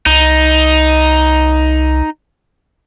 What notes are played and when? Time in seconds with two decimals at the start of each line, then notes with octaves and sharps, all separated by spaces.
0.06 C2 D#4